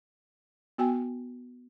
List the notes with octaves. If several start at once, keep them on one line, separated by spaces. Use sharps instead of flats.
B3 F#4 G5 G#5